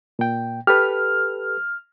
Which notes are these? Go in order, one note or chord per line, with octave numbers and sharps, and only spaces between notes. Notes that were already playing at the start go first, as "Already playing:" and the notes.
A#2 G5
G4 A4 B4 F6